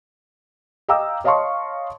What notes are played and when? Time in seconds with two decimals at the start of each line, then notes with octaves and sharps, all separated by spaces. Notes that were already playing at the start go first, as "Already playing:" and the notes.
0.89 D#5 F5 G5 A#5 D6 E6
1.24 C#5 D#5 F5 A5 C6 C#6